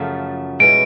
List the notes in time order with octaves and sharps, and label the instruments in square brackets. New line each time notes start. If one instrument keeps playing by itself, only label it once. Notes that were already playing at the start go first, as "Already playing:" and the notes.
Already playing: [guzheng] F#2 C#3 F3 A3
[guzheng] B2 G#3 C#4 E4 [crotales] D7